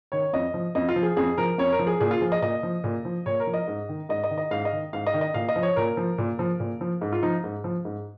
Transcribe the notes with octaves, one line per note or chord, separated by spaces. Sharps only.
D#3 C#5
F2 D#5
F3
F2 D#5
F4
F3
G#4
F2 G#4
F3 A#4
F2 C#5
A#4
F3
G#4
A#2 G#4
F4
F3 G#4
D#5
A#2 D#5
F3
A#2
F3
A#2 C#5
A#4
F3
D#5
G#2
D#3
G#2 D#5
D#5
D#3
D#5
G#2 F5
D#5
D#3
G#2 F5
D#5
D#3
D#5
A#2 F5
D#5
F3
C#5
A#2 A#4
F3
A#2
F3
A#2
F3
G#2
F4
F3 D#4
G#2
F3
G#2